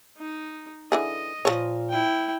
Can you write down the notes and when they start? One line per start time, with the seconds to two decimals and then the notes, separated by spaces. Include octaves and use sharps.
0.17 D#4
0.92 D3 E3 G#4 D#5
1.45 A#2 F3 A4 C#5
1.90 E4 G5